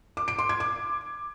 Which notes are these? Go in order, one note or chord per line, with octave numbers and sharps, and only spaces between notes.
D6
D7
C6
G#6
D6